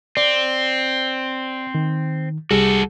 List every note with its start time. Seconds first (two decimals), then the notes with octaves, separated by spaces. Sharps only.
0.17 C4 D5
1.74 D#3
2.51 C2 G3 F#4 G#4 A4